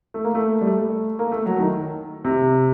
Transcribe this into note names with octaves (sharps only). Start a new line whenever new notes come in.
A3
A#3
A3
G3
A3
A#3
A3
F#3
D#3
C3